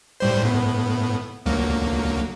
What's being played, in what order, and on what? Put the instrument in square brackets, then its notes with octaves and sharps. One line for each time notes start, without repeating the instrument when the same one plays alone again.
[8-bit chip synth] A2 G3 C5
A2 B3
D2 F#3 A#3